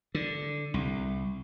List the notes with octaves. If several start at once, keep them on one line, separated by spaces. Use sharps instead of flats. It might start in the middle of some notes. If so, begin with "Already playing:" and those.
D3
C2